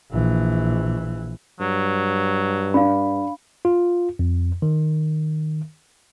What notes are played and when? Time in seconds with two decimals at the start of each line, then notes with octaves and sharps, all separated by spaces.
0.11 A#1 E3
1.60 G2 F#3
2.74 D4 F5 B5
3.65 F4
4.19 F2
4.62 D#3